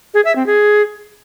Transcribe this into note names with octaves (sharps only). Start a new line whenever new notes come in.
G#4
E5
C4
G#4